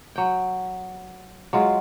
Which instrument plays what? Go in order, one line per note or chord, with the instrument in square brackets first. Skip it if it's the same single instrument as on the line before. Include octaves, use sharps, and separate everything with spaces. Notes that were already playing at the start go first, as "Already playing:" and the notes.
[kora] F#3 G5
F#3 G#3 F4